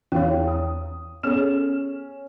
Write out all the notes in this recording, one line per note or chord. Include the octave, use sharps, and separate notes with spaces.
E2 C#5 F5 G5
D#6
B3 C#4 G#4 A4 F6 E7